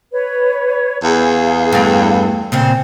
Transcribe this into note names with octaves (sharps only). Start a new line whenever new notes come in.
B4 C#5
E2 G#4 F5
G2 A3
A#2 C#3 C4